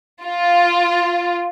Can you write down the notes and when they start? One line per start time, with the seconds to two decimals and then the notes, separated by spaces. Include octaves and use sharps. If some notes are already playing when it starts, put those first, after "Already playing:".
0.24 F4